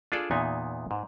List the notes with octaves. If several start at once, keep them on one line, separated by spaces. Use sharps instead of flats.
D4 F4 G#4 A4 D5
E2 A#2 B3 D#4 G#5
G#2